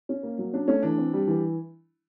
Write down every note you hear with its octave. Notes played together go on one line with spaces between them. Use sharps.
C#4
A#3
F#3
C#4 D4
A3 C#4
E3 D4
C4
G3
E3